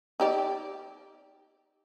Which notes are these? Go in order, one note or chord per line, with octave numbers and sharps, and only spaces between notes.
D#4 G4 D5